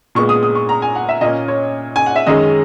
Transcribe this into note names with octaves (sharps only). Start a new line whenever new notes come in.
A#2 G#3 B3 C#6
D#6
D#6
C#6
A#5
G#5
F#5
E5
A#2 A#3 C#4 D#5
C#5
G#5
F#5
E5
F#2 D#3 G#3 C#4 D#5